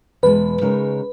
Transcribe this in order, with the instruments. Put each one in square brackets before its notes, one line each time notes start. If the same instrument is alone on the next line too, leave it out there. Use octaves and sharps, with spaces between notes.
[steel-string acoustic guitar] E2 B2 G#3 [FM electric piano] B4
[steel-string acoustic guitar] C#3 G#3 D#4 A#4 C#5